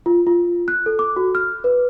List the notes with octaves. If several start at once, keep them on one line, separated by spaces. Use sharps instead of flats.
F4
F4
F#6
A4
D6
F#4
F6
B4